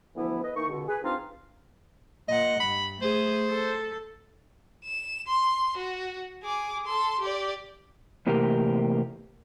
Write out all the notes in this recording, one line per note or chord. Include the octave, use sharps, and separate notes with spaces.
D2 E3 F3 B3 E4
B4 D#5
E3 A#3 D#4 C#6
C#2 B2 D3
G#4 B4
G2 C4 D4 D#4 F4 F5
A#2 D#5 F#5
G2 B5
A3 G#4 C5
A4
E7
C6
F#4
G#4 D6
A4 C6
G4 D5
E2 A2 C3 A#3 G4 A#4